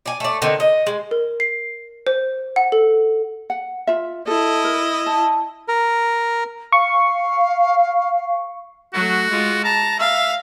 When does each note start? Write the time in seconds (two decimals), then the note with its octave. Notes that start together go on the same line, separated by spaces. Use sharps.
0.06 D5 G#5
0.20 A3 D5
0.42 D3 D#3 C4
0.60 D#5
0.87 G#3
1.11 A#4
1.40 C7
2.07 C5
2.56 F#5
2.72 A4
3.50 F#5
3.87 F4 E5
4.27 E4 A4 D#5
4.64 A#4
5.06 A5
5.68 A#4
6.72 F5 C#6
8.94 F#3 A3 F#4
9.30 G#3 F4
9.64 A5 A#5
9.99 E5 F5